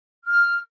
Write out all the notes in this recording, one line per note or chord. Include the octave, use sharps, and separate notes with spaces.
F6